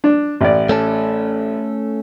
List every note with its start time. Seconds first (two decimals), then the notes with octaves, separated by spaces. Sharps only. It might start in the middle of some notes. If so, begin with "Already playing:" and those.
0.04 D4
0.41 A1 D5
0.69 A3 C#4 A4